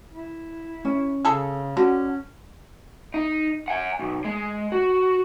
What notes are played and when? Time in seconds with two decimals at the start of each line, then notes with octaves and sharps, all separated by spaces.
0.13 E4
0.85 C#4
1.25 C#3 G#4 A4
1.77 D3 C#4 F#4
3.14 D#4
3.68 F#5 G#5
3.99 B1
4.24 G#3
4.72 F#4